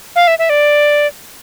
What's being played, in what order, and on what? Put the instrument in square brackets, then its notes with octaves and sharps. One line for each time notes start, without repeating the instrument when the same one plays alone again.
[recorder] F5
E5
E5
D5